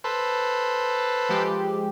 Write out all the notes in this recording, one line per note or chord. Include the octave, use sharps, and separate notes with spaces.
A4 B4 C5
F3 G#3 G4